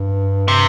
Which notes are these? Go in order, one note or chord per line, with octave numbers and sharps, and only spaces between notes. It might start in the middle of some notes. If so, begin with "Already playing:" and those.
Already playing: G2
C3